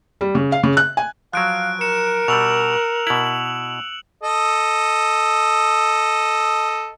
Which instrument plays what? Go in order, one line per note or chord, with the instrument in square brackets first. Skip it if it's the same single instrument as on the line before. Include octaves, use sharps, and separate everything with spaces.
[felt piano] G3
C#3
F5
C#3
F#6
G#5
[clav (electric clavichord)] F3 F#3 [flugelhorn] F5 [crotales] F#6 D7
[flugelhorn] A#4 [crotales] C#7 E7
[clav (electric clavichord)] B2 G3 [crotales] E6 F7
[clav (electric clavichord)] B2 E4 [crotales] F#7
[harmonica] A4 D#5